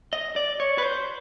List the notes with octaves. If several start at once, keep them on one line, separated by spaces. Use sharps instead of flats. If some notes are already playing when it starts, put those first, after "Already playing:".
D#5
D5
C#5
B4
C5